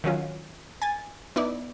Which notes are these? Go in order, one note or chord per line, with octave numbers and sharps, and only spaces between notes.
D#3 F#3 C#4 F4
G#5 A6
B3 D#4 E4 D5